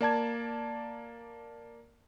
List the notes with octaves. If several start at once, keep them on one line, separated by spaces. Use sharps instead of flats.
A#3 D5 A5 G#6